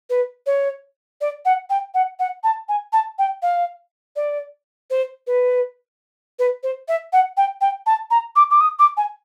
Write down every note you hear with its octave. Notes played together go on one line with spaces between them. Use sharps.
B4
C#5
D5
F#5
G5
F#5
F#5
A5
G#5
A5
G5
F5
D5
C5
B4
B4
C5
E5
F#5
G5
G5
A5
A#5
D6
D6
D#6
D6
G#5